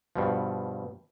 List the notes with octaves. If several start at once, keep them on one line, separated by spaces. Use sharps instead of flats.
G2 B2 F3